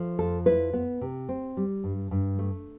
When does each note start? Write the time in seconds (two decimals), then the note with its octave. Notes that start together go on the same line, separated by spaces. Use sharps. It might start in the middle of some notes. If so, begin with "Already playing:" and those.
Already playing: F3 A3
0.19 F2 A4
0.46 E4 B4
0.73 B3
1.01 C3
1.29 C4
1.57 G3
1.84 G2
2.11 G2
2.39 A3